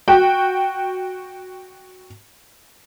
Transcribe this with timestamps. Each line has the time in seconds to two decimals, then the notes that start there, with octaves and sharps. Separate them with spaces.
0.08 F#4 G5